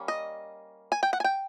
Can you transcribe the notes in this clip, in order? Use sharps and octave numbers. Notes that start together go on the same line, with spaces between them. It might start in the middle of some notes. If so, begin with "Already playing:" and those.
Already playing: G3 A#3 C#4
D#5
G#5
G5
F#5
G#5
G5